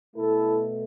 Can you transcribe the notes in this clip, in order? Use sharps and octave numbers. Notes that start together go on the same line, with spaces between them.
B2 A3 E4 A4